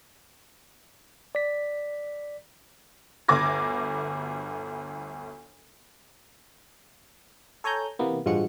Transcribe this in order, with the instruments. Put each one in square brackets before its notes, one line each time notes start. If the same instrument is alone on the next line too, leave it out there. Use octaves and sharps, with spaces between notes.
[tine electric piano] D5 B6
[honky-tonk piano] G1 D2 D6 G#6 A#6
[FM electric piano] A4 C#5 G#5 A#5 G6
C3 E3 A#3 B3
A1 G2 F3 G#3 F#4 C#7